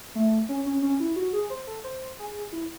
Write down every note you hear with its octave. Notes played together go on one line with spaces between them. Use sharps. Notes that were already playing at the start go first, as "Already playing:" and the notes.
A3
C#4
C#4
C#4
E4
F#4
G#4
C5
A4
C5
G#4
E4